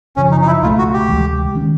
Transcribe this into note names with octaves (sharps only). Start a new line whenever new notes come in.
F#2 C#3 F3 C#4
D#4
D#4
E4
C#2 B2 F#3 A3 F4
F#4
G4
D2 C3 E3 G#3
D#3 G#3 C#4